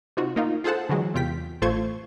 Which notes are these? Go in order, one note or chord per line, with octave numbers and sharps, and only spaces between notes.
C3 D#4 F4 F#4
A#3 D#4 F4
F4 G#4 A4 C5 F#5 A5
D3 E3 F#3 G#3
E2 C3 F4 G5 B6
A1 A3 F4 C5 C#6 G#6